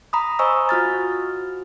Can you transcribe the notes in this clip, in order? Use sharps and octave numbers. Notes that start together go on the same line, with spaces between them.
A#5 B5 D#6
C5 D#5 G#5 C#6 D#6 E6
F4 F#4 F6 A6